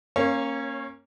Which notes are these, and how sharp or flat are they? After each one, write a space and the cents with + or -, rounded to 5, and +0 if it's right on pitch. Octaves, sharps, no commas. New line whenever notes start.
A#3 -5 C#4 -25 C#5 +5